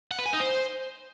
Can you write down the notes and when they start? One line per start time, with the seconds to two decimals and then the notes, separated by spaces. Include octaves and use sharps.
0.11 F#5
0.19 B4
0.26 G#5
0.33 D#4
0.41 C5